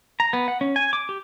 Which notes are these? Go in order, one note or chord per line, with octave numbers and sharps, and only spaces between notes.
A#5
B3
F#5
C#4
G#5
D6
G4